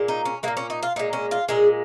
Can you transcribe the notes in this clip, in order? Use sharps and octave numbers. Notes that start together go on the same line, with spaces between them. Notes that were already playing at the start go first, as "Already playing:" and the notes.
Already playing: A#2 G#3
D#4
C#4
G#3 A#3
A#2
C#4
D#4
F4
A#2 G#3 D#4
C#4
F4
A#2 G#3 G#4